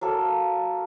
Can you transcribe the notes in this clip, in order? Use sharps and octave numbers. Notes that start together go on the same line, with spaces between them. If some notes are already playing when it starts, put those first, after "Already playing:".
F#3 A#3 A4